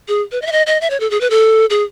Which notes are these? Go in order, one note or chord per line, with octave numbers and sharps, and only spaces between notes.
G#4
B4
D#5
E5
D#5
D#5
E5
C#5
A4
G#4
B4
A4
G#4